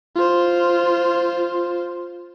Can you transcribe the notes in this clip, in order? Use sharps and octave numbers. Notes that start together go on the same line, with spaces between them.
F4 C5